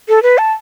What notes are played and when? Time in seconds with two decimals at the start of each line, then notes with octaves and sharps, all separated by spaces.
0.09 A4
0.23 B4
0.38 A5